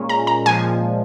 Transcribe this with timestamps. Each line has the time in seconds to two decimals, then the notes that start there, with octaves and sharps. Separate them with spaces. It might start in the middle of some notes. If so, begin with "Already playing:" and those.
Already playing: A#2 G#3 C#4
0.09 A#5
0.27 A#5
0.46 A#2 F3 G#3 G#5